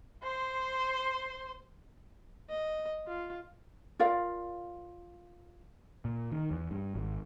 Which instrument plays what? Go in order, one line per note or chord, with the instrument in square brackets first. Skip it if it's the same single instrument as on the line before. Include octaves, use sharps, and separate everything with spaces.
[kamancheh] C5 C6
[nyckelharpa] D#5
F4
[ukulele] F4 A#4 D5 F5
[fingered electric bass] A#2
D#3
E2
G2
G#1